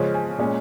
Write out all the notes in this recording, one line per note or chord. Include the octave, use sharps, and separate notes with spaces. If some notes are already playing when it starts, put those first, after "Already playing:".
Already playing: C#3 F3 G#3 C#4
G#5
A#2 G#3 C#4